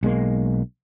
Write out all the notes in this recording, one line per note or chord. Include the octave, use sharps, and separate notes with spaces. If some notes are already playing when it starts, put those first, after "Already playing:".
B1 G#3 A#3